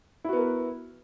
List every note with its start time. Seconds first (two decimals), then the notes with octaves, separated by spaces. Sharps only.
0.24 E4
0.29 F#4
0.33 B3
0.37 A#4